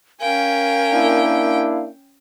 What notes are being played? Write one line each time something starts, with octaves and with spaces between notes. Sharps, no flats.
C#4 A#4 F5 G5 G#5
A#3 D4 E4